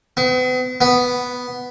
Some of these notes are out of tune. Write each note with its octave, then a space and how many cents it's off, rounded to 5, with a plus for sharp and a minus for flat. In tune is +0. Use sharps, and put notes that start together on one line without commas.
B3 +40
B3 +0